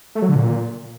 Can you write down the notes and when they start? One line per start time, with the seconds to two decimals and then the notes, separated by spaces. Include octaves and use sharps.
0.15 A3
0.22 F#3
0.29 D3
0.36 A#2